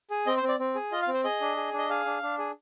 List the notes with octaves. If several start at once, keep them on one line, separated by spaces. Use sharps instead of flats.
G#4
C4 D#5
C5
C4
D5
C4
G#4
F4 D#5
F5
C4
C5
G#4 D#5
D4
G#4
D4
D#5
G#4 F5
D4
D4
G#4